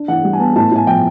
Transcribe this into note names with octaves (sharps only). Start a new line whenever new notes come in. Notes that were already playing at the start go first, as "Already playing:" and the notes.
Already playing: D4
E3 F#5
G3
G#5
B3 A5
A2 A5
A2 G#5
F3 G5